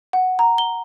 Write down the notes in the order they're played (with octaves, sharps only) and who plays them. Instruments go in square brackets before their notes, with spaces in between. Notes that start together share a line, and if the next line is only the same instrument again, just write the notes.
[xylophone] F#5
A#5
G7